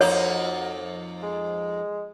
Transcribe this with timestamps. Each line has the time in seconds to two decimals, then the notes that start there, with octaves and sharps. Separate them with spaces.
0.01 F2 A#3 D#4 F#4 C#5
1.23 G#3